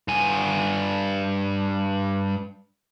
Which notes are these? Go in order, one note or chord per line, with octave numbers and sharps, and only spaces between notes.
G2 G#5